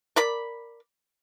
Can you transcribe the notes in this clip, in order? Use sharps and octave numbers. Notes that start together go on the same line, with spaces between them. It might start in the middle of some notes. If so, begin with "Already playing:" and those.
A#4 D5 B5